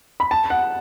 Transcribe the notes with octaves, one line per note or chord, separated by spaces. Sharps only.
B5
A5
F#5